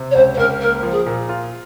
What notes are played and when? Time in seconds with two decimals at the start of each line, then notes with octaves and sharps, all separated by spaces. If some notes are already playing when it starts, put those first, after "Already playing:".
Already playing: C3
0.11 C#5
0.15 C#2 C5
0.34 C5
0.38 C#2 A#4
0.61 A#3 A#4
0.83 F3
0.91 G#4
1.06 A#2
1.29 F4